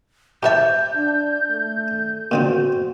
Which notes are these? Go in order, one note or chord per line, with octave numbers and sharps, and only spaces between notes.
E3 G4 C5 E5 F#5 A5 G6
D4
A3
A#2 D3 C4 F#4